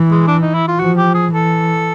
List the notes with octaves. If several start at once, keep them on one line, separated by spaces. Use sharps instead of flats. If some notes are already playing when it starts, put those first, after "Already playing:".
Already playing: E3
G#3
D4
D#4
E4
F4
F3 F#4
G4
G#4
E3 A4